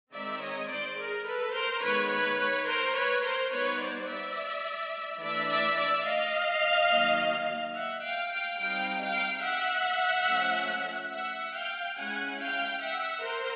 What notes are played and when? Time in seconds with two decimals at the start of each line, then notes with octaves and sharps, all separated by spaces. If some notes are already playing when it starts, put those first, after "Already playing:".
0.13 D#3 G#3 C4 D#4 D5 E5
0.42 C#5 D#5
0.70 C5 D5
0.98 G#4 A#4
1.26 A4 B4
1.54 A#4 C5
1.82 D#3 G#3 B3 B4 C#5
2.11 B4 C#5
2.39 B4 C#5
2.67 A#4 C5
2.95 B4 C#5
3.23 A#4 C5
3.51 G3 B3 D#4 B4 C#5
3.80 C5 D5
4.08 D5 E5
5.20 E3 A3 D4 D5 E5
5.49 D5 E5
5.77 D5 E5
6.05 D#5 F5
6.90 D#3 F#3 A#3 D#4
7.74 E5 F#5
8.02 F5 G5
8.31 F5 G5
8.59 G3 C4 D#4 F5 G5
9.01 F5 G5
9.43 E5 F#5
10.28 F3 A3 C#4
11.13 E5 F#5
11.55 F5 G5
11.97 G#3 C#4 E4 F#5 G#5
12.39 F5 G5
12.82 E5 F#5
13.24 A#4 C5